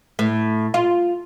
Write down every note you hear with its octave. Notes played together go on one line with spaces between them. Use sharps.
A2
F4